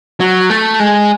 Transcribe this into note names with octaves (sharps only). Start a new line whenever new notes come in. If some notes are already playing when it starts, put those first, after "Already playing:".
F#3
A3
G#3